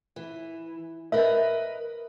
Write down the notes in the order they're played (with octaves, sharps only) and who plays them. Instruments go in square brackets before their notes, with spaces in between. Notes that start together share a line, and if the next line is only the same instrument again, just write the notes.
[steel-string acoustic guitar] E3
[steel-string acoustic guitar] A#4 B4 D#5 [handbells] E5